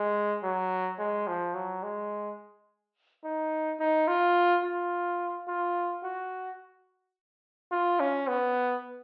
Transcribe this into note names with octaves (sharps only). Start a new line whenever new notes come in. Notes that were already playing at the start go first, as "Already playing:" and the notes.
Already playing: G#3
F#3
G#3
F3
F#3
G#3
D#4
D#4
F4
F4
F4
F#4
F4
C#4
B3